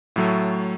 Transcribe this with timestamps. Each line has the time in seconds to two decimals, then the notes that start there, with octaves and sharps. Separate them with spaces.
0.16 A2 F#3 A3